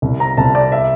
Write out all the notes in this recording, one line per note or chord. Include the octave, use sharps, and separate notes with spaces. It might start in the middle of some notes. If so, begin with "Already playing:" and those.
C2
A#5
C2 A5
D5
E5